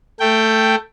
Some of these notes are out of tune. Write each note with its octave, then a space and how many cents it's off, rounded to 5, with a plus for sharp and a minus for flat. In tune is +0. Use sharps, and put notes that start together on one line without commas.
A3 +10 G5 +0